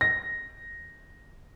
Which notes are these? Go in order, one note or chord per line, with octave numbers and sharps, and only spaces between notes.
A#6